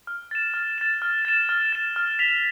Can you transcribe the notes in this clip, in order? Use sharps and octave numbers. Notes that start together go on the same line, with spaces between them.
F6
A6 E7
F6
A6 E7
F6
A6 E7
F6
A6 E7
F6
B6 F7